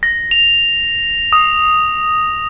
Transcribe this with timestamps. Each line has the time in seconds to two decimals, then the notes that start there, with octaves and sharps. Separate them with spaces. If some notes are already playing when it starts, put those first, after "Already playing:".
0.03 A#6
0.31 F7
1.33 D#6